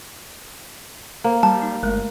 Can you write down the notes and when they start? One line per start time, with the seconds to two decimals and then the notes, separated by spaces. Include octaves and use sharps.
1.24 A#3 C5
1.43 G3 A5
1.62 D#4
1.83 G1 G#3 A3 A#4